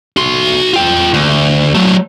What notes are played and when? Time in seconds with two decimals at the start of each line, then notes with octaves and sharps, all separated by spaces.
0.17 F#4 C6
0.73 F4 G5
1.14 D2
1.75 F#3 A3